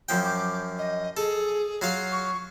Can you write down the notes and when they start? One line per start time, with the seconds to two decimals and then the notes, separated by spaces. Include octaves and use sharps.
0.09 F#2 F3 G5
0.24 D6
0.78 D#5
1.17 G#4 A4
1.82 F#3 F4 F5
2.12 C#6